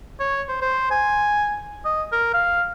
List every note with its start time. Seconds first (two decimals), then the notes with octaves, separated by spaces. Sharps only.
0.20 C#5
0.48 C5
0.62 C5
0.91 G#5
1.85 D#5
2.12 A#4
2.34 F5